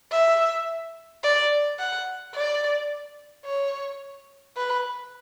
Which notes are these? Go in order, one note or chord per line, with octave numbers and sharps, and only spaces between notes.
E5
D5
F#5
D5
C#5
B4